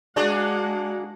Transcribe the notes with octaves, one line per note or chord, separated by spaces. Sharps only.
G#3 A#3 D4 F#4 G#4 D5 F#5